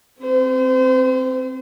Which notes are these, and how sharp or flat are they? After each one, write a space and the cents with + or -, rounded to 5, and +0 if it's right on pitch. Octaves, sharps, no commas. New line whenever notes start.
C4 +0 C5 -35